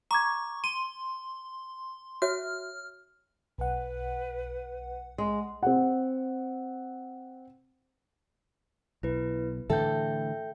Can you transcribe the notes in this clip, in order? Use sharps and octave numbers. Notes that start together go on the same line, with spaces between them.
A#5 C#6 D6 G#6
C6 D#7
F#4 C#5 E5 F6
B1 B4 F#5
G#3
C4 F#5
B1 E4 B4
A2 D3 E3 A4 E5 G5 G6